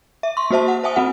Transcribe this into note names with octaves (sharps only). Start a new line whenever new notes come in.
E5
C6 C#6
A#3 F#4 C5 E5 A5
F#5
C5 E5 G#5 D#6
C4 F#4 F#5